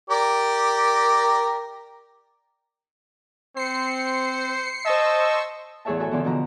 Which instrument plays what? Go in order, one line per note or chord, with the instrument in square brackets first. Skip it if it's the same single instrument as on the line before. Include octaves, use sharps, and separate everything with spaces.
[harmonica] G4 A#4 D5
[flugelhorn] C4 [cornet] C5 [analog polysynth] C7 C#7
[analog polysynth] C5 C#6 E6 [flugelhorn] D#5 [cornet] A5
[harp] E2 A2 G#4 C#5 E5 A5
F#4 A4 E5 G#5
E2 B2 D3 E3 F3
B2 D3 F3 F#4 A#5